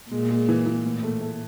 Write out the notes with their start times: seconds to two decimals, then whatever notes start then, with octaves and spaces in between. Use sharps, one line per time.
0.11 A#2 G#3
0.30 G#3
0.49 E3
0.66 E3
0.85 A2
1.03 A3
1.21 A3